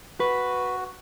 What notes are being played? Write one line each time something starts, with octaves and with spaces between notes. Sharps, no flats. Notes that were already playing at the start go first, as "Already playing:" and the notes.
F#4 B4